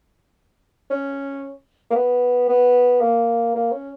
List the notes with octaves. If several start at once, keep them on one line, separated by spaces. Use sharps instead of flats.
C#4
A#3
B3
B3
A#3
A#3
C#4